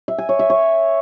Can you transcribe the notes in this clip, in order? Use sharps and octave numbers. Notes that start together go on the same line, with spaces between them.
E5
G#5
C#5
E5
C#5